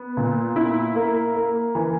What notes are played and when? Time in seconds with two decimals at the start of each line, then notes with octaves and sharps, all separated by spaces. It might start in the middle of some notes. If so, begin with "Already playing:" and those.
Already playing: B3
0.17 A#2
0.56 E4
0.95 A#3
1.35 A#3
1.75 E3